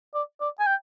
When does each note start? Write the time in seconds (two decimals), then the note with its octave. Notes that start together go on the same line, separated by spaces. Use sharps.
0.14 D5
0.41 D5
0.59 G#5
0.67 G5